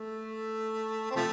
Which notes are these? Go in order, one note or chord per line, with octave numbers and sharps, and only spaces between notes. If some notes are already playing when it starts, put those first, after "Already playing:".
Already playing: A3
C4
C3 F3 A3